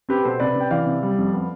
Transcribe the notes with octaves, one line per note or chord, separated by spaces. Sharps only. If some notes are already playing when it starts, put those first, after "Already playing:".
C4 G4 B4
B2 A4 C5
C3 B4 D5
C3 G5
E3 D5 F5
C3
G3
F2
B3